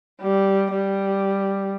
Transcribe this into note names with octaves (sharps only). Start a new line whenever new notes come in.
G3
G3